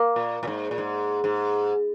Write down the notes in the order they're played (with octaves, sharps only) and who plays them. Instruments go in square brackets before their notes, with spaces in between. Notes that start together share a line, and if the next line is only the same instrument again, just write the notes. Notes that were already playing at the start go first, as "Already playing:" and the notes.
Already playing: [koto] A#3
[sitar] A#2
A#2
G#2
A#2
G#2
G#2